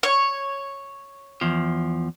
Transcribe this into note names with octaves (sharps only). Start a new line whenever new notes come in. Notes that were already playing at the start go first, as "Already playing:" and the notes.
C#5
E2 F3